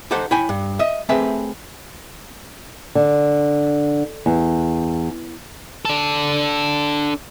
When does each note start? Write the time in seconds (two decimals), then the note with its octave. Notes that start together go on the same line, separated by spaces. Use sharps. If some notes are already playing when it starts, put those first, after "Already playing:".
0.11 D#4 G4 A4 C5 F#5
0.31 E4 C#5 G5 G#5 B5
0.49 G2
0.79 D#5 E5
1.09 A3 C4 G4 G#4 B4 E5
2.95 D3
4.26 E2
5.85 D4 A4